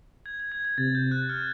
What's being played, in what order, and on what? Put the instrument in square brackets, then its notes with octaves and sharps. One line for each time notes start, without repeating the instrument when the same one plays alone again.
[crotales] G#6
G#6
G#6
G#6
[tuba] C3 [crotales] A6
[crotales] G6
F#6
F6